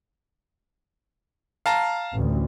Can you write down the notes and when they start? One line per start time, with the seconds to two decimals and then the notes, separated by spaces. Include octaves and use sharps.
1.66 F5 A5 A#5
2.13 A1 D2